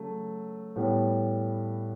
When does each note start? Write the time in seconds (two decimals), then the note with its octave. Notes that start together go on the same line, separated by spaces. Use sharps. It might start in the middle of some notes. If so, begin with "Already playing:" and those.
Already playing: C#3 F#3 A3
0.76 A2 G3 B3